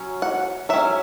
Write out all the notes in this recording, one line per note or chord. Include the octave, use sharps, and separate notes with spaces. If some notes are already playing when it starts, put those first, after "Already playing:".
Already playing: F#3 C#4
F#5
F#3 C#4 E5